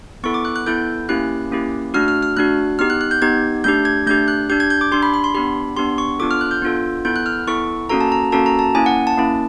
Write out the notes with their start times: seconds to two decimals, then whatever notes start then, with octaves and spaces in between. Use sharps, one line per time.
0.24 B3 E4 A4 C#6
0.34 D6
0.45 F#6
0.56 F#6
0.66 B3 E4 A4 G6
1.09 A#3 C#4 E4 G4 F#6
1.51 A#3 C#4 E4 G4
1.94 A3 D4 F#4 F6
2.08 F6
2.23 F6
2.37 A3 D4 F#4 F#6
2.79 B3 D#4 G4 F6
2.90 F#6
3.01 F#6
3.11 G6
3.22 B3 D#4 G4 G#6
3.64 A3 D4 G4 G6
3.85 G#6
4.07 A3 D4 G4 G6
4.28 F#6
4.49 D4 G4 G6
4.60 G#6
4.70 G6
4.81 D6
4.92 D4 G4 C6
5.03 B5
5.14 B5
5.24 C6
5.35 B3 D4 G4 B5
5.77 B3 D4 G4 C6
5.98 C#6
6.19 B3 D4 F4 A4 D6
6.31 F6
6.41 F#6
6.51 G6
6.62 B3 D4 F4 A4
7.05 B3 E4 A4 G6
7.16 F#6
7.26 F6
7.47 B3 E4 A4 C#6
7.89 A#3 C#4 F#4 A4 A#5
8.01 A5
8.12 A#5
8.32 A#3 C#4 F#4 A4 A5
8.46 A#5
8.59 A5
8.75 A#3 C#4 E4 G#5
8.86 F#5
9.07 A5
9.18 A#3 C#4 E4